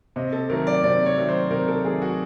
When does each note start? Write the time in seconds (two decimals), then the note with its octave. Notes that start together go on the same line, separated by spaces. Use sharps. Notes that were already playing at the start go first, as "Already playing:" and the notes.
0.16 C3 D#5
0.32 A4
0.50 D#3 F#3 A3 A#4
0.67 D5
0.84 C3 D5
1.06 C#5
1.17 D#3 F#3 A3
1.29 C5
1.51 C3 A#4
1.68 A4
1.84 D#3 F#3 A3 G#4
2.02 F#4